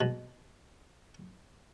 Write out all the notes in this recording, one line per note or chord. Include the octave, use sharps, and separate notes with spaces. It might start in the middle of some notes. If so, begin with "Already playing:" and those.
B2